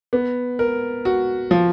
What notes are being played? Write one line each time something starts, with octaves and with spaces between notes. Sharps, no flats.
B3
A#4
F#4
F3